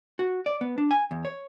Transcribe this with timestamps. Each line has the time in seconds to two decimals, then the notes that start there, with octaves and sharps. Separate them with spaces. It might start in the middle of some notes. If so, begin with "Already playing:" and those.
0.19 F#4
0.46 D5
0.61 B3
0.78 D4
0.91 G#5
1.11 E2
1.25 C#5